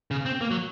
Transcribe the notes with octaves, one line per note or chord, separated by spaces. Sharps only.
C#3
C4
A#3
F#3